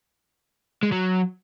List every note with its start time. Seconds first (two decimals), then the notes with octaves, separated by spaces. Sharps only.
0.83 G#3
0.92 F#3